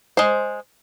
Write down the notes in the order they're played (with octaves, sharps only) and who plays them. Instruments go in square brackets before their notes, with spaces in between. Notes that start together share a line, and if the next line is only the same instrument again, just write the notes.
[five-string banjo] G#3 C5